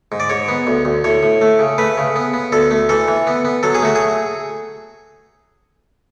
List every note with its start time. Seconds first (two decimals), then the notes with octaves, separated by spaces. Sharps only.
0.12 G#2
0.20 D5
0.30 G#2 C#5
0.48 B3
0.67 D2
0.85 D2
1.04 A2 C#5
1.23 A2
1.41 A3
1.59 C#3
1.78 A3 B4
1.97 C#3
2.16 B3
2.33 B3
2.52 D2 A4
2.71 A3
2.89 E3 A4
3.08 E3
3.27 B3
3.45 B3
3.63 F#3 A4
3.75 G#4
3.82 A3 F#4
3.95 G#4